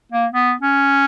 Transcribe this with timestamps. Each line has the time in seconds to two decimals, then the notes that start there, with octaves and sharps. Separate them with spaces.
0.12 A#3
0.32 B3
0.62 C#4